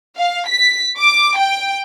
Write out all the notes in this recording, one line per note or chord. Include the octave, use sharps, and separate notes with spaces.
F5
B6
D6
G5